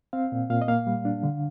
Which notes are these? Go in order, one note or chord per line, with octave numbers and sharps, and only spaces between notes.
C4 F5
A#2
A#2 F5
D#5
A#3 F5
G3
D4
D3